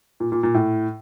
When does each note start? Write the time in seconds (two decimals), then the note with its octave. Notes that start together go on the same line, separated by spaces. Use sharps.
0.20 A#2
0.32 A#2
0.43 A#2
0.54 A2